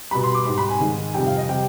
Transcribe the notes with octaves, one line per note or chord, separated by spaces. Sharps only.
B2 G3 B5
C6
D6
G#2 G3 C6
B5
G#5
G#2 D#3 G#3
F2 C3 G3 G5
F5
D#5
C3 G3 G5